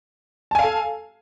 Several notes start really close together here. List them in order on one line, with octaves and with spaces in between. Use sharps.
A5 G#5 F5 A4